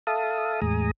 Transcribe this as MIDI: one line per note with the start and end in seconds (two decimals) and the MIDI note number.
0.07 0.61 69
0.07 0.61 76
0.07 0.61 77
0.07 0.61 81
0.07 0.61 87
0.62 0.91 40
0.62 0.91 45
0.62 0.91 56
0.62 0.91 80
0.62 0.91 82
0.62 0.91 87